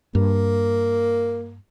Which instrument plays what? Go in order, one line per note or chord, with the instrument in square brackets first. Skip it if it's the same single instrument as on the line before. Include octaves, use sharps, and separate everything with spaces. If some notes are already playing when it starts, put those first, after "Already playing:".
[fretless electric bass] G2 [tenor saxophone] A#3